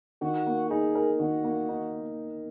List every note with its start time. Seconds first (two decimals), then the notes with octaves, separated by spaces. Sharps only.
0.22 D#3 F#4
0.46 A#3
0.70 D#4 G#4
0.95 A#4
1.19 D#3 F#4
1.44 A#3
1.69 D#4